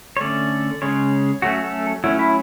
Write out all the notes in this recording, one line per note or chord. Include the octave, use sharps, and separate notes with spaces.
C#5
D3 A3 C#4 D5
C#3 G#3 C#4 C#5
F#3 A3 C#4 F#4
A4
F#3 A3 C#4 E4
E4